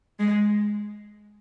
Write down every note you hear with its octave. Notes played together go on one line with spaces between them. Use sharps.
G#3